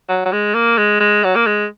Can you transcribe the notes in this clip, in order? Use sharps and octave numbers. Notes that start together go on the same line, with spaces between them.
F#3
F#3
G#3
A#3
G#3
G#3
F#3
A#3
G#3